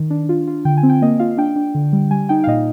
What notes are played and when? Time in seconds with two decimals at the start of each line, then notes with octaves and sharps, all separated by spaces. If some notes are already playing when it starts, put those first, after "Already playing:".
Already playing: D#3
0.10 D4
0.29 F4
0.48 F4
0.65 D3 G5
0.77 G#5
0.83 C4
0.89 G5
1.02 A#3 D#5
1.19 F4 F5
1.38 D4 G5
1.56 D4
1.75 D3
1.93 G3
2.11 G3 G#5
2.29 D#4 G5
2.44 F5
2.47 A#2 D#5